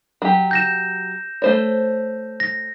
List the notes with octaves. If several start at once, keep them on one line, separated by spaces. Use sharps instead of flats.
F#3 G4
G6 A#6 E7
A3 C5 C#5
A#6